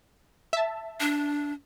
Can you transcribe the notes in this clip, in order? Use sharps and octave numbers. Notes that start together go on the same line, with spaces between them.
E5 A5
D4